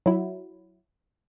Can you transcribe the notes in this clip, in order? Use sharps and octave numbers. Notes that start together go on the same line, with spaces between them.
F#3 E4